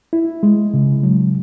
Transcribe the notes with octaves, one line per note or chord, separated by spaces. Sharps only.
E4
G#3
C#3
F#3